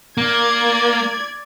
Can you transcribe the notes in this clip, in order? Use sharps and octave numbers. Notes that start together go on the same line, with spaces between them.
A#3 D5 G#6